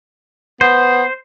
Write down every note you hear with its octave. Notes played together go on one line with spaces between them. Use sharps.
B3 C5